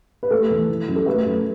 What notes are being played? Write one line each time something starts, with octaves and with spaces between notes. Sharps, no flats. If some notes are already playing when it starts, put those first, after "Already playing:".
B4
A3 A4
E2
E3
F#2
A4
A3 B4
F#2